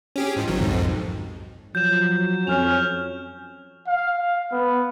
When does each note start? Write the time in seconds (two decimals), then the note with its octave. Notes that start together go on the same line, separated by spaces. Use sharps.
0.16 C#4 G4 G#4
0.36 G#2 F3
0.48 G#1 D#3 F#3
0.61 B1 F2 G#2
1.75 F3 F#3 G6 E7
2.47 F2 C#4 F6 F7
3.88 F5
4.52 B3